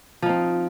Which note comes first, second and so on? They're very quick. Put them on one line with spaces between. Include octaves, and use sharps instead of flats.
F3 D#4 C4